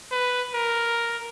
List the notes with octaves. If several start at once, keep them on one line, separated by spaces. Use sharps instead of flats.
B4
A#4